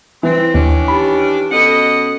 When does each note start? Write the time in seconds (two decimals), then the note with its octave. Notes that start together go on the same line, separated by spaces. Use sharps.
0.23 E3 C4
0.54 D#2 D#3 C#4 D4 D#5
0.88 D#4 G4 A5 B5
1.52 B2 C#4 A4 D#5 F#5